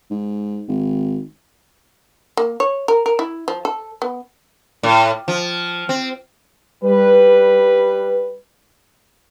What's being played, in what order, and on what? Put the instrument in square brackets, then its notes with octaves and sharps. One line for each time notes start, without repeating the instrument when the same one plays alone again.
[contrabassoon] G#2
G#1
[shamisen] A#3
C#5
A#4
A#4
E4
F3
A4
B3
[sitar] A2
F3
C4
[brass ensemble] G3 B4